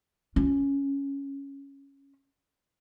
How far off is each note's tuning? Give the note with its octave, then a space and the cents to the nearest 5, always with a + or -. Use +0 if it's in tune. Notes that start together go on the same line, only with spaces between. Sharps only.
C#4 +0 F4 +0